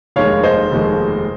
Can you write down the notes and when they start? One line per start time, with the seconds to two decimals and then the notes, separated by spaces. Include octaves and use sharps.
0.16 F1 D#2 D#3 G#3 C#5 F5
0.43 C5 D#5
0.71 F1 D#2 D#3 G#3